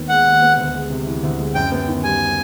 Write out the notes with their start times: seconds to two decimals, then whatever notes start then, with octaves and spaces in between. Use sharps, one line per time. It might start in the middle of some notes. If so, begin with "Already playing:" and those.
Already playing: D#2 D#3 B3
0.09 G#3 F#5
0.26 D#2
0.42 B3
0.58 D2
0.74 G#3
0.90 C3
1.07 E3
1.23 D2
1.39 G#3
1.55 F#2 G5
1.72 B3
1.88 D#3
2.04 G3 G#5